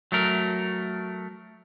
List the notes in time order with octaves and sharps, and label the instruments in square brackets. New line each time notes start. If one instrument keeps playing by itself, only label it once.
[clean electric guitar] F#3 A3 A#4